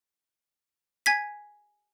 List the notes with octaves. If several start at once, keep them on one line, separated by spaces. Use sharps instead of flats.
G#5 G#6 B6